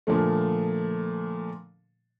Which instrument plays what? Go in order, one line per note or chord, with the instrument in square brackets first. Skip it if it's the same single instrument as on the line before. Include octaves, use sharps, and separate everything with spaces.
[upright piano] A#2 D3 F3 A3